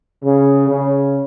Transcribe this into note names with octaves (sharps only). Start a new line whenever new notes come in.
C#3
C#3